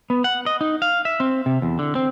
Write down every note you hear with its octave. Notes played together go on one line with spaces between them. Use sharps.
B3
F#5
D#5
D#4
F5
E5
C4
C3
E2
D3
C4